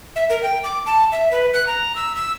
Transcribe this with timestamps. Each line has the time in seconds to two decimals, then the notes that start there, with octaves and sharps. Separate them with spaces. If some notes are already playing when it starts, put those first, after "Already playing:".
0.16 E5
0.30 A#4
0.43 G5
0.64 D6
0.86 A5
1.12 E5
1.31 B4
1.54 F#6
1.67 A#5
1.96 E6
2.15 E6